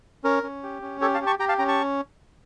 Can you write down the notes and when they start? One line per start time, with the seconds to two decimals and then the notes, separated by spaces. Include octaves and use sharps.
0.24 C#4 A#4
0.43 C#4
0.63 G4
0.82 C#4
1.01 G4 A4 C#5
1.14 F5 A5
1.21 G4
1.26 A5 C#6
1.39 G4 G5 A#5
1.49 F5 A5
1.58 C#4 G5 A#5
1.68 A5 C#6